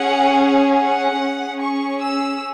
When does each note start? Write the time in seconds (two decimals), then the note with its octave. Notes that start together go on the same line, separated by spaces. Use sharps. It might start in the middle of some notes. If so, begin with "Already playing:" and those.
Already playing: C#4 G#4 F#5
0.75 F#5
1.18 C#4 G#4
1.60 C#6
2.01 E6